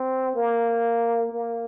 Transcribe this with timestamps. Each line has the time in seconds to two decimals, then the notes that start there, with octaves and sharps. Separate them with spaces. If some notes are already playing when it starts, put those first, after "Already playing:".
Already playing: C4
0.35 A#3
1.32 A#3